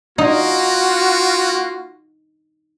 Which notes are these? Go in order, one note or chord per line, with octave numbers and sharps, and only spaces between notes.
A#3 D#4 F4 F#4